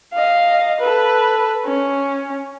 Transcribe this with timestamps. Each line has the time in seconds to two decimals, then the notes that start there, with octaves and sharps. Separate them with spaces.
0.13 D#5 F5
0.79 A4 B4
1.65 C#4